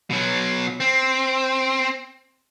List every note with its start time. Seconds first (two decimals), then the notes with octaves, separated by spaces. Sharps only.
0.10 B2 F#3
0.80 C4